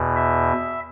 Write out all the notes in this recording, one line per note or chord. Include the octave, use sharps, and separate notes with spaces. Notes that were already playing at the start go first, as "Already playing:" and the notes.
Already playing: E2 B2
E5